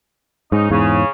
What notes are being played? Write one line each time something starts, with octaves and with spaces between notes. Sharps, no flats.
G#2 C#4 D#4
E2 G#2 C#3